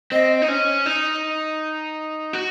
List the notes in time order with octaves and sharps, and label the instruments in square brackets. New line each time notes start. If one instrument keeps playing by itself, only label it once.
[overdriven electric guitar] C4 [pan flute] D#5
[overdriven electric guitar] D#4
C#4
D#4
F#4